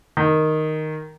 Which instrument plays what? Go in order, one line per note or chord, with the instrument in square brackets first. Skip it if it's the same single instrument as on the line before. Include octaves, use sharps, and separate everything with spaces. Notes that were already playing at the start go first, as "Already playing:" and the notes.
[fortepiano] D#3